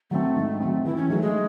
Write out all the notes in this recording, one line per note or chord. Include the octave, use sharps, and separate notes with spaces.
F#3 A3 C4
G#2
F#3 C4
E3 E4
C#4
F#3 A3 D#4 G#4
G#3